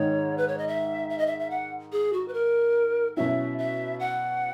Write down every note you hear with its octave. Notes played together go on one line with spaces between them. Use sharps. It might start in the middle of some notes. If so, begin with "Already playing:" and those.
Already playing: G#2 D#3 G#3 D#4 C#5
B4
C#5
D#5
E5
E5
D#5
E5
E5
F#5
G#4
F#4
B4
A#4
B2 F#3 C#4 E4 E5
E5
F#5